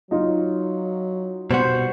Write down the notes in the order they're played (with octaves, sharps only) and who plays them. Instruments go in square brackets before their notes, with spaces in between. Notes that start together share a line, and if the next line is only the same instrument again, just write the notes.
[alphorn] F#3 [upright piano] D#4 F4
[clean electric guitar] B2 G3 F#4 [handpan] C5